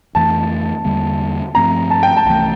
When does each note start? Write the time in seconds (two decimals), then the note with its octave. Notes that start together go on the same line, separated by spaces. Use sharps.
0.15 F2 E3 A3 A5
0.85 E2 D3 G3 A#3
1.55 G2 F3 A3 C4 A#5
1.90 A5
2.03 G5
2.17 A5
2.25 C2 C3 E3 A3